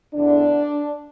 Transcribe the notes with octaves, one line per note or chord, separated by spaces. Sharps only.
E2 D3 D4